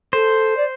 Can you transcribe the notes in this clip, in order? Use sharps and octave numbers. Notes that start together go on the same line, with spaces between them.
A4 C5
D5